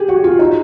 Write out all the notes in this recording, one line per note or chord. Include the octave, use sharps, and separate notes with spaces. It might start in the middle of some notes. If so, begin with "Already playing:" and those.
Already playing: G4 G#4
F#4
F4
D#4